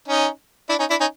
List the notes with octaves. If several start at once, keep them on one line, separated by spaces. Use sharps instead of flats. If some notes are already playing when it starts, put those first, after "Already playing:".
C#4 D#4
D4 E4
C#4 D#4
D4 E4
C#4 D#4